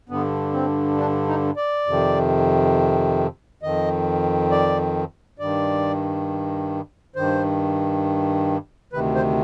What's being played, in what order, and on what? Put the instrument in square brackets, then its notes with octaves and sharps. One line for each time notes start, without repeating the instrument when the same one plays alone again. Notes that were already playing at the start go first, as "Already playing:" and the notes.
[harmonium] G2 D3 B3
C4
D4
D#4
D5
F2 C3 D#3
F2 D#3 D#5
D5
G2 D#3 D5
G2 D#3 C5
D2 C3 D#3 B4
C5